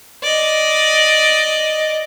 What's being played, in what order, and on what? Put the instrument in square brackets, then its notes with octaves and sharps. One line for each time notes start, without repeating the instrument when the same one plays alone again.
[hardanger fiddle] D5 D#5